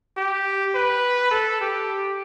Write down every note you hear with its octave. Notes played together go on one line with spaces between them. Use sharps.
G4
B4
A4
G4